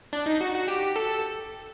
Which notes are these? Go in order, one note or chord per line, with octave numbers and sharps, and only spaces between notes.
D4
D#4
F#4
F#4
G4
A4